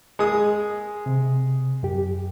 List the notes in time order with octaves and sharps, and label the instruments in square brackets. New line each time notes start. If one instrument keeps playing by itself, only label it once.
[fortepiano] G#3 D#6
[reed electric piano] C3
F#2 G4